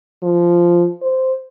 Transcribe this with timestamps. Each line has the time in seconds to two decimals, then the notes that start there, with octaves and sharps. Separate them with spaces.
0.23 F3
1.02 C5